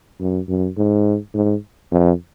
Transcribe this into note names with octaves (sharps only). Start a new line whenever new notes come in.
F#2
F#2
G#2
G#2
F2